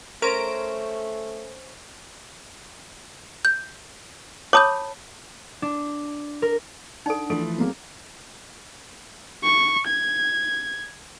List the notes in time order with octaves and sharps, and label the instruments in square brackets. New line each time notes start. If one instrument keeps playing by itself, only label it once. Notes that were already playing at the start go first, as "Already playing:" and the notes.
[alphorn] A3 [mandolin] C#4 C5 [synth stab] A#4 A#5 D7
[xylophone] G6
[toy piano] C#5 A5 B5 [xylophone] D6 D#6 G6
[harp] D4
A#4
[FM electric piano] D4 D5 F#5 [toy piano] D#4 A4
[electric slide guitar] E3 F3 A3 [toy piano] A4
[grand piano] F#3 A#3 G#4 [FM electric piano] C4
[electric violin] C#6
G#6